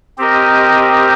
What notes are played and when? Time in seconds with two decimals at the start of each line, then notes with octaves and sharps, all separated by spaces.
0.18 C4 G4 A#4 D#5